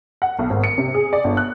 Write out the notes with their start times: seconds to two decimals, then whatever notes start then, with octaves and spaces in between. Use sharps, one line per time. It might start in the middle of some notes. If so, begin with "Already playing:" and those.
0.22 F#5
0.39 B1
0.50 G#1
0.64 C#7
0.78 C3
0.94 G#4
1.13 D5
1.24 G1
1.37 F#6